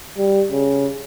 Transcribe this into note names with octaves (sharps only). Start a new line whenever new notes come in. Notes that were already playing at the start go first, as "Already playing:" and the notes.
G3
C#3